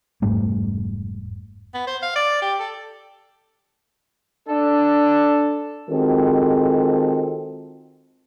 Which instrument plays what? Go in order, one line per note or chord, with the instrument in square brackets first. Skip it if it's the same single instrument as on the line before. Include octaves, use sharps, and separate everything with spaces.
[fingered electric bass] F1 G#2 G3 A3
[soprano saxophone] B3
C5
F5
D5
G4
A4
[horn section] D4 A4
[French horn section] D#3 G#3 C4 F4 F#4 A4